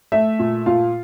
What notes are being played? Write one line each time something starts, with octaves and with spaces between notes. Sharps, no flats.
A3 E5
A#2
A#2 F4 F5